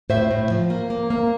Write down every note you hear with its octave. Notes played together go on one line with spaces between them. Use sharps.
A2 C5 E5
A2
F3
A#3
A#3
A#3